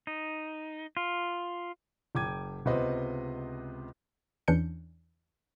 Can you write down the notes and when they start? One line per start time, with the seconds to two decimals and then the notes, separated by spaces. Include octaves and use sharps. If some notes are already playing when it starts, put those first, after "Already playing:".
0.07 D#4
0.97 F4
2.15 F#1 G5 D6 G#6 D#7
2.65 C#2 C3 B3 B4 C5 D#5
4.48 E2 E3 C#4 D4 G6 C#7